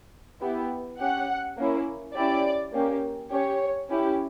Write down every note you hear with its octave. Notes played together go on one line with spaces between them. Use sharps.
B3 E4 G4
C#4 G4 F#5
A#3 C#4 E4
C#4 E4 G4 D5
A#3 C#4 G4
C#4 G4 C#5
C#4 E4 G4